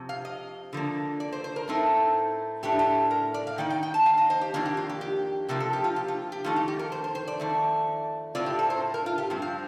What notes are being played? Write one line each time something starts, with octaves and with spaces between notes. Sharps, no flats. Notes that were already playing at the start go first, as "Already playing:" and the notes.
Already playing: F2 C3
F5
D#5
D3 F3 A#3
D5
C5
C5
A#4
A2 A3 C4 D#4
A2 A3 D4 G4
G4
A#4
D5
F5
D#3 A#3 D#4 G5
G5
G5
A5
F5
D#5
C5
G4
F2 D#3 A#3 D4 F4
G4
F4
G4
G4
C3 F3 A#3 G4
A4
G4
F4
G4
F4
G4
F2 D#3 A3 D#4 F4
G4
G4
A#4
C5
C5
C5
D5
F2 D#3 A3
A2 A3 C4 F4 D5
G4
A4
C5
A#4
F4
G4
G2 F3 C4
F5